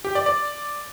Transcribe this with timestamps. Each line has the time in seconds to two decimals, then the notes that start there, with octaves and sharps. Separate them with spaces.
0.05 G4
0.15 D5
0.26 D5